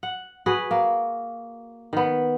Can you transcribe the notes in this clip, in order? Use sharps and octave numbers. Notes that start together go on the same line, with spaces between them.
F#5
F#4 G#4 B4
A#3
D#3 B3